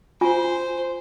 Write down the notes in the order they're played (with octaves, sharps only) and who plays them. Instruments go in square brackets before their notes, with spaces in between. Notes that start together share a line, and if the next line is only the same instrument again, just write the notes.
[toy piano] F4 G#5 [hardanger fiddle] C5